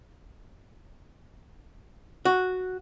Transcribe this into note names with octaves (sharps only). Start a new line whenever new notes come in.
F#4